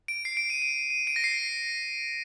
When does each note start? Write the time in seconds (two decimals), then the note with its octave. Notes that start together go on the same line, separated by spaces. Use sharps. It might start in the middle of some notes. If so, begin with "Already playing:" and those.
0.08 D7
0.25 C7
0.37 D7
0.50 D#7
0.62 D#7
0.90 D#7
1.07 D7
1.16 A#6
1.24 C7